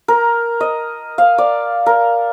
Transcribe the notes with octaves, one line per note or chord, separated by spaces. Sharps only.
A#4
D#5
F5
D5
A#4